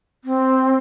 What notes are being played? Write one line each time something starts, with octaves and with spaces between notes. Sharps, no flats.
C4